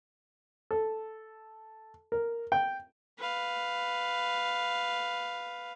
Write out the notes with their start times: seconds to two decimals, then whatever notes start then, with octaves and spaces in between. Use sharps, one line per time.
0.71 A4
2.12 A#4
2.52 G5
3.18 B4 F5